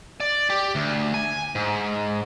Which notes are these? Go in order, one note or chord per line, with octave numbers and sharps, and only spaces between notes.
D5
G4
D2
G#5
G#2